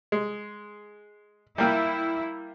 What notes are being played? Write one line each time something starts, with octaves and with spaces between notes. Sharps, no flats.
G#3
G3 A#3 E4 G5